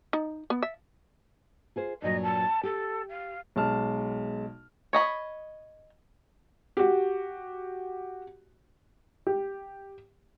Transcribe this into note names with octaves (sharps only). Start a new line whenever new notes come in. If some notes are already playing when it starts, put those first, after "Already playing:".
D#4
B3
E5
F4 G#4 C5
G2 A#2 F#3 D#5
A5
G4 A4
F5
B1 G#3 A5 F6
C#5 D#5 B5
F#4 G4
G4